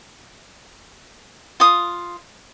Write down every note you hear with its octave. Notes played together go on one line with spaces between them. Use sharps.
F4 D#6